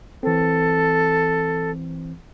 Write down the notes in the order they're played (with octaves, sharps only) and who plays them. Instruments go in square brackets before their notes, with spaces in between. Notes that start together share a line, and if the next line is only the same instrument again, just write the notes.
[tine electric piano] E3 C4 [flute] A4